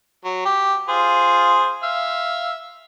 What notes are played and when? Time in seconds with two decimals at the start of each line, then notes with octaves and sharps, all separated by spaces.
0.25 F#3
0.45 G4
0.89 F4 G#4 C5
1.83 E5 F5